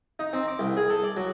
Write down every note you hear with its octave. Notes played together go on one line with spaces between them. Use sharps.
D#4
C4
D6
C2
G#4
A4
D5
F#3